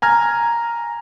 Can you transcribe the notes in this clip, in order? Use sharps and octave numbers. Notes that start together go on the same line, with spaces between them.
G#5 A#5 F6 G#6